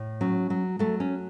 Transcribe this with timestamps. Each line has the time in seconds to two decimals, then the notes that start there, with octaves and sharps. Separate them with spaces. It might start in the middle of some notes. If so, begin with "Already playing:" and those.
Already playing: A2
0.21 F#3 C#4
0.50 F#3
0.79 F#3 A3
1.00 C#4